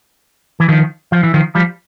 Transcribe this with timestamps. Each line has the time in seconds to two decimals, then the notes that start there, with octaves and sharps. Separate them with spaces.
0.60 E3
0.69 D#3 F3
1.12 F3
1.23 E3
1.34 D#3 F3
1.55 F3 G3